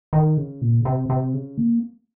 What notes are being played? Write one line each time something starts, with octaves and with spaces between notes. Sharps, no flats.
D#3
C#3
A#2
C#3
C3
C3
C#3
A#3